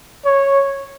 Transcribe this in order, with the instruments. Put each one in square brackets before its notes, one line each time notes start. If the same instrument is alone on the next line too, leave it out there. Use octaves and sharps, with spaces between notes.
[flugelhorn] C#5